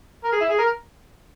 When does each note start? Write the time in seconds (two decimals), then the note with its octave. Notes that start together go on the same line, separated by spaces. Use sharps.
0.24 A#4
0.32 G#4
0.41 E4
0.49 G#4
0.59 A#4